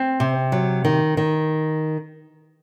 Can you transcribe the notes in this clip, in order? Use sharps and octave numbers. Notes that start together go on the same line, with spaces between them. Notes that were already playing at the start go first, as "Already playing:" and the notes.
Already playing: C4
C3
F#3
D#3
D#3